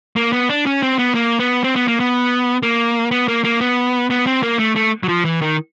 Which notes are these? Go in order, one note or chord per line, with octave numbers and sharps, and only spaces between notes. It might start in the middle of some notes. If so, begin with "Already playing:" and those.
A#3
B3
D4
C#4
C4
B3
A#3
B3
C4
B3
A#3
B3
A#3
B3
A#3
A#3
B3
B3
C4
A#3
A3
A3
F#3
F3
E3
D#3